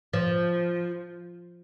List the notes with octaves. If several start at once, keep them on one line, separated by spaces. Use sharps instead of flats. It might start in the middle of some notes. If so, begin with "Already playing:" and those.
F3